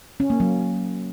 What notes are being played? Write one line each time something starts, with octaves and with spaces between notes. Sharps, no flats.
C#4
A#3
F#3